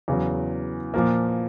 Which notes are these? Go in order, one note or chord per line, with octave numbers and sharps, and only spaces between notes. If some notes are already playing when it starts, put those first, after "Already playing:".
E2 C#3 F#3
A#2 F3 A#3